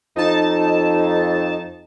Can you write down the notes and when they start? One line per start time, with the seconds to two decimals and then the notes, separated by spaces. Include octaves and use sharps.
0.16 F2 D#4 A5